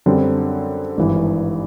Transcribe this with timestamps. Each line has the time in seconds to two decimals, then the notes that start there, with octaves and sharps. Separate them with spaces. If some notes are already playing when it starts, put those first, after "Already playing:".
0.06 F#2 D3 G3 C4
0.97 G#1 G2 E3